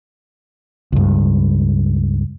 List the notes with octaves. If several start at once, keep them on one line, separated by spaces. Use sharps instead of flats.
C#2 G2